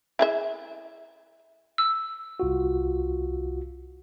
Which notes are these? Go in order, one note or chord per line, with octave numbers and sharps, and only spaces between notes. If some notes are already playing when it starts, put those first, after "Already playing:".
E4 G#4 E5
E6
C2 F4 F#4